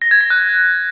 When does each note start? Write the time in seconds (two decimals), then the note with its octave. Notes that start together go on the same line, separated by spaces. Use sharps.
0.02 A#6
0.11 G#6
0.21 A#6
0.30 F#6